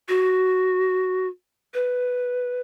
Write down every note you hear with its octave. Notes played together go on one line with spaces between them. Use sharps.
F#4
B4